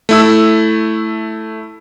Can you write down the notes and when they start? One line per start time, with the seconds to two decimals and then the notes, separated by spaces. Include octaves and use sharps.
0.09 A3 E4 E6